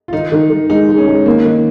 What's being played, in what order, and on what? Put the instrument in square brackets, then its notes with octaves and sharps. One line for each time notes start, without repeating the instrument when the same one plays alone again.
[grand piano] F4
[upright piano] D#3 [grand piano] D#4
[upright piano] D#3
D#3
[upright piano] G#3 [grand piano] D#4
[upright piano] G#3
[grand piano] C#4
[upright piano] G#3
[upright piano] D#3 [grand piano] A#3
[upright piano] D#3